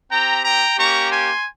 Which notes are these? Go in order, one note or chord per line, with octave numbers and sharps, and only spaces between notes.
C4 G4 G5 A#5
G5 A#5
A#3 C#4 G4 A#5 C#6
G#5 C6